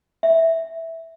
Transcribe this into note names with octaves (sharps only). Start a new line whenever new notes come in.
E5